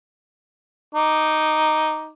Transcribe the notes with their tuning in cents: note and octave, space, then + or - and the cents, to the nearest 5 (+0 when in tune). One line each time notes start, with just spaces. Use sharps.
D#4 +0 D6 +0